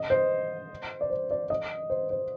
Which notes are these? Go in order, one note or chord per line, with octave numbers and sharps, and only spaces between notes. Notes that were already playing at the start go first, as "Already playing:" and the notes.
Already playing: D#5
C5
D5
C5
D5
D#5
C5
C5